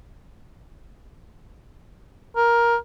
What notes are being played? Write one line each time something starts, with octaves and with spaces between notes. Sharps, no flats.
A#4